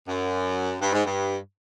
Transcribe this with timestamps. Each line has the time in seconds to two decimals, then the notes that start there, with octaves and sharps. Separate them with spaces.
0.08 F#2
0.81 G2
0.92 G#2
1.05 G2